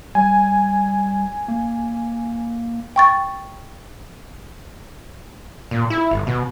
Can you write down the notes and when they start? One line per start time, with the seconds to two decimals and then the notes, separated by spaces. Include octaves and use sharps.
0.15 G3 G#5
1.48 A#3
2.96 G5 C#6 A6
5.71 A#2
5.90 E4
6.11 G1
6.27 B2